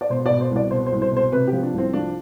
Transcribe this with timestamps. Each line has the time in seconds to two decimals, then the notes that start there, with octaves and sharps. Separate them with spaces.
0.01 D5
0.10 B2 C5
0.26 B2 D5
0.41 C5
0.51 C2 D5
0.71 B2 C5
0.86 C5
0.92 C2
1.02 C5
1.12 B2 C5
1.32 C3 B4
1.47 G4
1.53 F3
1.63 D4
1.74 C2 C4
1.93 F3 D4